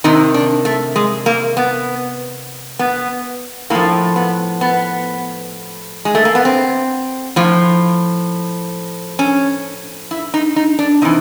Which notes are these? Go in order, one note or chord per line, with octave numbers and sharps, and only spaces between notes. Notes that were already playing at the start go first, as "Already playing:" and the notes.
C3 D#3 D#4
D4
A3
G#3
A#3
B3
B3
A2 F3 A#3
B3
B3
G#3
A3
A#3
B3
C4
A2 F3
C#4
E4
D#4
D#4
D4
C3 E3 D#4